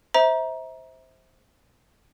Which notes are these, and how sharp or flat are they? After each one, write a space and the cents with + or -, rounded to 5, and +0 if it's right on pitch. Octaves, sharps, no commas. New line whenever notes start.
C5 +0 E5 -25 A#5 +20